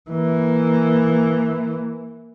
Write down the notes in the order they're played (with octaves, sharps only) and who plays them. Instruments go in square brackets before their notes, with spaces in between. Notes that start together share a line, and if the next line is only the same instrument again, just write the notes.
[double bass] E3 A#3